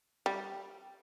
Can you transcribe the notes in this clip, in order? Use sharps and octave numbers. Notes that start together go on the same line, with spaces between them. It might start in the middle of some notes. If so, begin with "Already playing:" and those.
G3